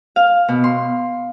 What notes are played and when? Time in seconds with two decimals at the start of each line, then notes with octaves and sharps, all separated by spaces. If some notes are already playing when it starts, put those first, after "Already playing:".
0.16 F5
0.48 B2
0.64 C6